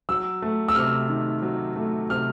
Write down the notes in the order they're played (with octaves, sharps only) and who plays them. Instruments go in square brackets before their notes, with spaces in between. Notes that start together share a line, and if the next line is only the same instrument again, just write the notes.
[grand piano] F#3 E6
A3
E6
C3 F6
D#3
F#3
A3
C3 F6